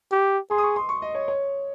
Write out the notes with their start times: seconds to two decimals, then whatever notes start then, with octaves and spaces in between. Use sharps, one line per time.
0.12 G4
0.50 G#4 C6
0.58 D#6
0.63 C#6
0.76 C6
0.89 C#6
1.02 D#5
1.15 C#5
1.28 C#5